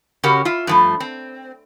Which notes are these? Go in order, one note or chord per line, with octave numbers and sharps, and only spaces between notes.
C#3 C#4 F#4 G4 A#4
F4 E5
G2 F3 A3
C4